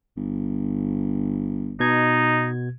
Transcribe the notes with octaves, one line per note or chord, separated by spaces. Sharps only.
G1
B2 D#4 G#6